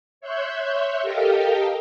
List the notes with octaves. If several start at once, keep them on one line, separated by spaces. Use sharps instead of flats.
C#5 E5 C6 F#6 G6
G4 A4 A#4 D#5 F5 G5